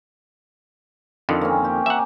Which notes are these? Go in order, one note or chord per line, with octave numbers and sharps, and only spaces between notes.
F2 D3 D#3
A#3 C4 C#4
G4
E5 F#5 G#5 A#5 D6